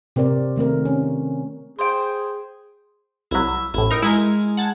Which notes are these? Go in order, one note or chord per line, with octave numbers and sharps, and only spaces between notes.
C3 C4 A#4 D5
D#3 A3 C4 A#4
C#4
G#4 C5 G5
C2 F#3 E4 E5
A1 A2 E4
D#4 A#4
G#3 E4 G#4 A#4
F#5 A5 G#6